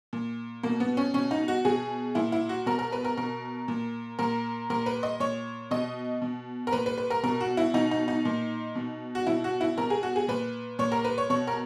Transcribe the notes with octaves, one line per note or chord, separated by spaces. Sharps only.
A#2
B2 A#3
B3
C#4
B2 C#4
D#4
F#4
B2 G#4
A#2 E4
E4
F#4
B2 A#4
A#4
B4
A#4
B2 A#4
A#2
A#2 A#4
A#2 A#4
B4
D#5
A#2 C#5
B2 D#5
B2
A#4
A#2 B4
B4
B4
A#4
B2 A#4
F#4
E4
B2 D#4
D#4
D#4
A#2
B2
F#4
B2 E4
F#4
E4
B2 A#4
G#4
F#4
G#4
A#2 B4
A#2 C#5
A#4
B4
C#5
B2 C#5
A#4